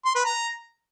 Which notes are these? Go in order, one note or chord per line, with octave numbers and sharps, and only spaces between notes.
C6
B4
A#5